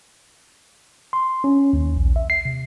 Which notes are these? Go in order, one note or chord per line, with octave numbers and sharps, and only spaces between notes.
C6
C#4
D#2
A#1
E5
C7
C3